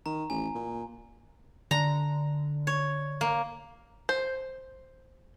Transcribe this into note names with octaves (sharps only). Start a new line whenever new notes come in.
D#3 A#5
A1 G#5
A#2
D3 A#5
C#5
A#3
C5